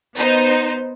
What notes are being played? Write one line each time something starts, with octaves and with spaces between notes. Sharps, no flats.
B3 D#4 C5